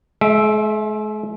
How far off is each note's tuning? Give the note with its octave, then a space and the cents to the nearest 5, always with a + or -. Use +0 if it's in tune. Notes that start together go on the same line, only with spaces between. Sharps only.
G#3 +45 E5 +0